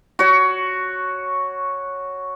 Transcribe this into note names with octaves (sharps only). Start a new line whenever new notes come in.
F#4 C#5